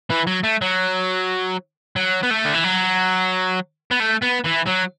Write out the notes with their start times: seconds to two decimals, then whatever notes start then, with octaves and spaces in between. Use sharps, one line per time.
0.10 E3
0.27 F#3
0.44 A3
0.62 F#3
1.96 F#3
2.23 B3
2.31 A3
2.45 D3
2.54 E3
2.64 F#3
3.91 B3
4.00 A3
4.22 B3
4.44 E3
4.66 F#3